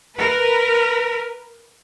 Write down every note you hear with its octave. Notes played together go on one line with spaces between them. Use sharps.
A#4 B4